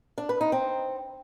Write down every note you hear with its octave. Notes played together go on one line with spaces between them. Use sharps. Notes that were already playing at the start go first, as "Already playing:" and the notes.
D4
B4
D#4
C4